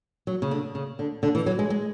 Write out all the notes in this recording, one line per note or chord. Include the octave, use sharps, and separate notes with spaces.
F#3
C#3
D3
C#3
D3
D3
E3
F#3
G#3
G#3